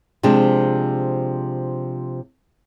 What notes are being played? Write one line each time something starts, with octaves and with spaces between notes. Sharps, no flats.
C3 F3 G#3 D4